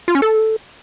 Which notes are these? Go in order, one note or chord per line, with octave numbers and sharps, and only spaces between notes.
F4
C#4
A4